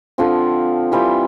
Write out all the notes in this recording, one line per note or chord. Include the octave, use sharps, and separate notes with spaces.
D3 F3 C4 F4
E3 G3 C4 F4